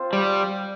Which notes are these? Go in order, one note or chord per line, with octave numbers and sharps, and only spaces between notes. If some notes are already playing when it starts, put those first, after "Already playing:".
Already playing: C4 F4 C5
G3